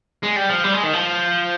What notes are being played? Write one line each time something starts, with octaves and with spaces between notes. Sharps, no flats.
G#3
G3
F3
G3
G#3
D#3
F3